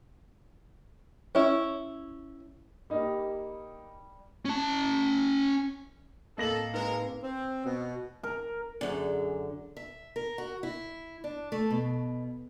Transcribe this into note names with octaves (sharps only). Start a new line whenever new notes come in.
C#4 E4
G3 A#3 D#4
C#4 A5
A2 A#3 C4 A4 D#5 F5 A#6 F#7
G#3 D#4 A#4 B4
C4
B2
A#4
F#2 D3 G#4
E5
A#4
F#4
E4
D4
A3
B2